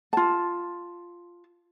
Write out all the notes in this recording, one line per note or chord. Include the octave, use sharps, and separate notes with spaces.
F4 A5